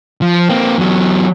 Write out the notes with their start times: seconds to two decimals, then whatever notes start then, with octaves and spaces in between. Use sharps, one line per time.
0.22 F3
0.49 A#3 C4
0.78 E2 F#3